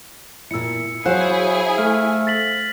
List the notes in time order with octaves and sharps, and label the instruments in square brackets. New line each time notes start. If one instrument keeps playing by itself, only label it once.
[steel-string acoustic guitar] A#2 E4 [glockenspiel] E6 C#7
[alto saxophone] F#3 [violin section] E4 G#4 [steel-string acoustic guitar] C5 F5 F#5 [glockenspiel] F#6
[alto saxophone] A3 [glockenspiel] F6
[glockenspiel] A6 B6 F#7